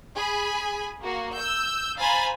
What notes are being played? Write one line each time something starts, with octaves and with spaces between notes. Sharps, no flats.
G#4 G#5 B5
A#3 F#4
E6 G6
C5 F5 G#5 A#5 B5 A6